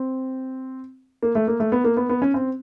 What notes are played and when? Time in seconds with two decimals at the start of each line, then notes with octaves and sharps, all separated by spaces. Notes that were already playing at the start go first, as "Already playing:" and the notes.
Already playing: C4
1.23 A#3
1.35 A3
1.48 A#3
1.60 A3
1.72 B3
1.84 A#3
1.97 B3
2.09 B3
2.22 C#4
2.34 C4